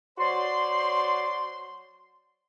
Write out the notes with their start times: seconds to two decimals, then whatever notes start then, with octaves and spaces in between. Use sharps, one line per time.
0.18 F#3 F#4 C5 D5 C6